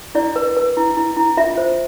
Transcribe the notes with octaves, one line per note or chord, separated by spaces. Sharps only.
E4 D5
B4
B4
E4
E4
E4
F4 E5
C5